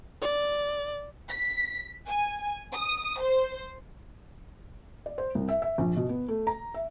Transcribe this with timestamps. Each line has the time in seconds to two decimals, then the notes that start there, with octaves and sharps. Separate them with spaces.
0.22 D5
1.29 B6
2.07 G#5
2.73 D#6
3.21 C5
5.06 D5
5.18 C5
5.35 C2
5.49 E5
5.62 E5
5.78 A#1
5.96 B2
6.09 B3
6.28 A3
6.47 A#5
6.74 E5